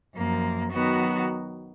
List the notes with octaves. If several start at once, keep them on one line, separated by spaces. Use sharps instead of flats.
F#2 F3 A#3
D#3 F#3 B3 F#4